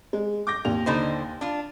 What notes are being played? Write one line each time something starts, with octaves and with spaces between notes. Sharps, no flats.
G#3
D6 G6 A#6
D#2 A#2 F7
D3 D#4 C5
D4 F4